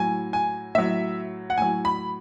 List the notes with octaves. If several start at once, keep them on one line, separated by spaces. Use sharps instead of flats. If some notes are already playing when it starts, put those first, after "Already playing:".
Already playing: A2 F#3 G#5
G#5
A2 F#3 E5
F#5
A2 F#3 G#5
B5